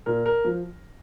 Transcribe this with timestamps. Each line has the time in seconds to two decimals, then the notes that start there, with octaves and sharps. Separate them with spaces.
0.06 A#2 A#4
0.26 A#4
0.45 F3